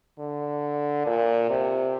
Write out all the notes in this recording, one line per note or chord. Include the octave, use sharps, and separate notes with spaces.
D3
A#2
C3